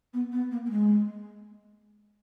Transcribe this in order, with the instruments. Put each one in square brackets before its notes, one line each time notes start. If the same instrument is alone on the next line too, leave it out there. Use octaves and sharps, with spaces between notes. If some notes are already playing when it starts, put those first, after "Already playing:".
[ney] B3
B3
A#3
A#3
G#3